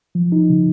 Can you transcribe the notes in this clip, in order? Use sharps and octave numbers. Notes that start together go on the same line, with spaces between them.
F3
D#4
C#3